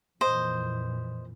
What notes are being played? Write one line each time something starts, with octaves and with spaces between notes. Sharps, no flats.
F2 A#2 E3 C5 D#5